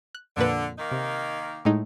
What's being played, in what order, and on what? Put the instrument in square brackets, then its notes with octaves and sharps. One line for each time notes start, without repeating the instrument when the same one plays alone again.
[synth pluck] F#6
[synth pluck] F2 A#2 B4 [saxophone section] D3
[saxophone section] D#3 A#3 D#4
[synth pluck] C3
A2 G#3 D#4